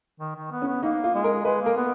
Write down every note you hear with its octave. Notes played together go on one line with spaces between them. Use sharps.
D#3
D#3
B3
C#4
B3
A#3 D#4
F4
G#3
A#4
G#3 B4
A#3 A#4
B3